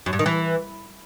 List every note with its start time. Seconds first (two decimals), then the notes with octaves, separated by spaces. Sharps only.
0.06 F#2
0.13 G2
0.19 D#3
0.26 E3